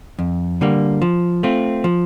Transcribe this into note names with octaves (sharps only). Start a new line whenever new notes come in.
F2
D3 G3 A#3
F3
A3 C4 F4
F3